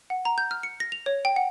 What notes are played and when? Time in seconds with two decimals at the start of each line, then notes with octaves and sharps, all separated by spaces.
0.10 F#5
0.25 A#5
0.38 G6
0.51 F6
0.63 C#7
0.80 A#6
0.92 F7
1.06 C#5
1.25 G5
1.36 F#5